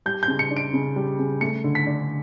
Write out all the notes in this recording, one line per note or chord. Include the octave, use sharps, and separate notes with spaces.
G3 G6
G6
C#3
C#7
D4
D7
C#3
G3
C#3
A3 C#7
D3
B6
D4